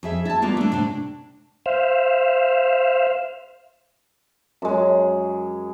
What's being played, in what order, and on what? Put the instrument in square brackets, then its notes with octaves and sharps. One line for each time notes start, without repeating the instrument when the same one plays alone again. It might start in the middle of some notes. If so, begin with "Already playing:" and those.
[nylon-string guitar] F2 G#4 E5
E4 A5
G3 A#3 B3 F4
A3 D4
A2 C3 D4
[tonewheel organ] C5 E5 F5
[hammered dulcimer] F#2 G#3